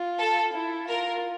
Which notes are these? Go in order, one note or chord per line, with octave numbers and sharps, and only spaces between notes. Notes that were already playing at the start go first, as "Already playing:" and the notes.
Already playing: F4
A4
E4
F4 A#4